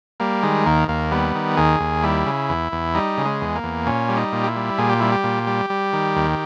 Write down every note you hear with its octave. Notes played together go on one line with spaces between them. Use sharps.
G3 A#3
D#3 G#3
D#2 A#3
D#2 A#3
G3 B3
D#3
D#2 G#4
D#2
G3 E4
C#3
E2
E2
G3 D#4
C#3
G#3
E2
A#3
E2
A#2 C#4
G3
D#4
A#2
G4
E4
G3
A#2 G#4
G4
G3 E4
G4
A#2
G3
G3
D#3
D#2